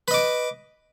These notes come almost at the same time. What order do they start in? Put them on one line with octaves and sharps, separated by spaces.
B4 D#5 D6